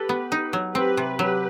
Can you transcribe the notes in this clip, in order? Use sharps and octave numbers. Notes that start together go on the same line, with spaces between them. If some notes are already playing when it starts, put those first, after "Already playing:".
Already playing: G4 A4 B4
B3
D#4
F#3
C4 G4 B4
C3
F#3 G4 B4